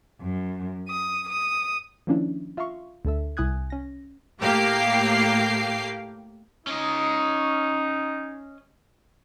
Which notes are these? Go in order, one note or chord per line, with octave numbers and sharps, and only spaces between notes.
F#2
D#6
D#6
D#3 F3 A#3 C#4 D4 E4
F4 E5 F5 A#5 C6 C#6
D2 D3 A4 E5
C2 E4 G#5 D#6 F#6 G#6
C#4 A#6
A2 A#3 G4 F5 G5 C7
C#4 D#4 D#5